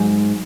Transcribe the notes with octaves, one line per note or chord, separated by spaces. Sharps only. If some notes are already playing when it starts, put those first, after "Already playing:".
Already playing: G#2 F#3